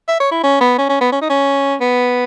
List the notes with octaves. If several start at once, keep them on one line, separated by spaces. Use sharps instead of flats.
E5
C#5
E4
C#4
B3
C#4
C#4
B3
C#4
D#4
C#4
B3